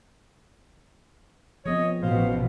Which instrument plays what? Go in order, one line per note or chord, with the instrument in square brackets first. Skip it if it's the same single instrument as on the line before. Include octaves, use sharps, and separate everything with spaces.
[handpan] F3 B3 C4 [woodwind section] G#4 C#5 D#5
[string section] A1 B2 [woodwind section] C5 F5